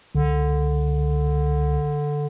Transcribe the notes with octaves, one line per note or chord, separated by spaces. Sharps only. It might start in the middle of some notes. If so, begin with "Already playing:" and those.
C#2 D3